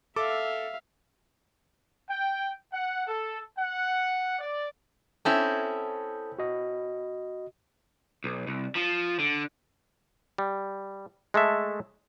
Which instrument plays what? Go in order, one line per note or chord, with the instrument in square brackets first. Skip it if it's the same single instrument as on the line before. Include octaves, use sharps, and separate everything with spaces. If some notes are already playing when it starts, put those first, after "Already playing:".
[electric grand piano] A4 D6 [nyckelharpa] E5 F5
[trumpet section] G5
F#5
A4
F#5
D5
[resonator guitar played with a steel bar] C4 C#4 E4 [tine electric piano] A4 A5 D#6
[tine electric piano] F#4 D#5
[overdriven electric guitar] B1
C2
F3
D3
[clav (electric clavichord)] G3
G#3 A3 A4 E5